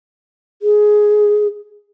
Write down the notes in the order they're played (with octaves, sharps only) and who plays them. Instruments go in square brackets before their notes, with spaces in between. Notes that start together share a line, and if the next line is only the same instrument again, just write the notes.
[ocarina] G#4